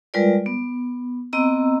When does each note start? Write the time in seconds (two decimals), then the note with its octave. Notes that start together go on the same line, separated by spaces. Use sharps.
0.14 G3 G#3 F4 A#4 B4 D5
0.46 B3
1.33 B3 C4 D#5 A#5 E6